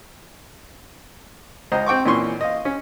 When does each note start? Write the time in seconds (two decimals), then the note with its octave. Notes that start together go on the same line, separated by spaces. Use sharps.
1.72 C#2 C5 D#5 A#5
1.86 C4 G5 C#6 D6
2.05 A#2 E3 C#4 C6 C#6
2.41 D#5 F5
2.65 C#4